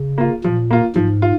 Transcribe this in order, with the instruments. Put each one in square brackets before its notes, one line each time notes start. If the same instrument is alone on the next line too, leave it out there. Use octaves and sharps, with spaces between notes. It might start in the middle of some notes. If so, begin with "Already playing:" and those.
Already playing: [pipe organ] C#3
[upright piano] A#3 F4
[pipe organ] A#2 [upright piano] F3
[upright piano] A#3 F4
[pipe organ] G#2 [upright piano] F3
[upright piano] F4